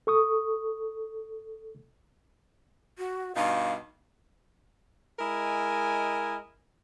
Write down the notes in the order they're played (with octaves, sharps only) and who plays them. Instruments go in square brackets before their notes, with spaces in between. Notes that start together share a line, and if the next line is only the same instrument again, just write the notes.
[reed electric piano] A4 C#6 D#6
[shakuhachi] F#4
[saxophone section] G2 B2 D#4 [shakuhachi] F5
[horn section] G#3 E4 A#4 D#5 G#5